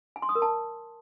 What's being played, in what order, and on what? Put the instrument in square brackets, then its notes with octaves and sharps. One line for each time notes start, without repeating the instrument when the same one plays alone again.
[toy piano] G#5
C6
D#6
A#4
A5